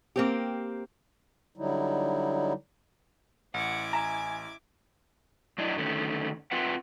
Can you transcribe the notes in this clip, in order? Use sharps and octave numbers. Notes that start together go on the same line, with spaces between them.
A#3 C4 G4
D3 F#3 G3 D#4 E4
A1 E4 F#5 D6 G#6
E5 G#5 A#5
F#2 D4 E4 D#5
D3 D#3 A3 C#4
C4 F4 B4 E5 F#5